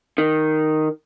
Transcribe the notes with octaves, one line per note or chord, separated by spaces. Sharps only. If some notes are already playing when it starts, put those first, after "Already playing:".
D#3